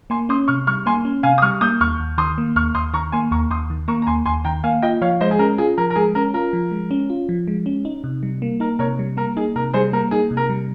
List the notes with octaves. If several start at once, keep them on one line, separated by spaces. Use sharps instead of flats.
A#3 G#5 C6
C#4 C6 D#6
C3 C#6 F6
G3 C#6 F6
A#3 G#5 C6
C#4
C3 F5 G#5
D#6
G3 C#6 F6
A#3 D#6 G6
D#2 C#6 F6
D#2
D#3 C6 D#6
A#3
D#2 C#6 F6
D#2 C6 D#6
D#3 A#5 C#6
A#3 G#5 C6
D#2 A#5 C#6
D#2 C6 D#6
D#3
A#3 A#5 C#6
A#5
D#2 G#5 C6
D#2 G#5 C6
D#3 G5 A#5
A#3 F5 G#5
F4 D#5 G5
F3 C#5 F5
G#3 C5 D#5
G#4
C#4 A#4
F4 G#4
F3 A#4
A#4
G#3 G#4
C#4 A#4
F4 A#4
F3
G#3
C#4
F4
F3
G#3
C#4
D#4
C3
G3
A#3
D#4 A#4
C3 A#4 C#5
G3
A#3 A#4
D#4 G#4
C3 A#4
G3 G#4 C5
A#3 A#4
D#4 G#4
C3
A#4
G3